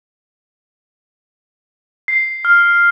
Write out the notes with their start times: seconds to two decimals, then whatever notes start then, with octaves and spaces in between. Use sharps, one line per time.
2.08 C7
2.45 F6